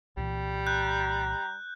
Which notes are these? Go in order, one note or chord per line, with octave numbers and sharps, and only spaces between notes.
C2 A#2 E3 G3
A#5 F#6 G6